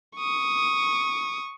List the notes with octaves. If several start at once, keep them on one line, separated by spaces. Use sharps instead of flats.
C#6 D#6